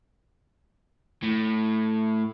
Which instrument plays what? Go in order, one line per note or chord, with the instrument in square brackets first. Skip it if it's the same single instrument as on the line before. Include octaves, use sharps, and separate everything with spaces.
[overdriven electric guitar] A2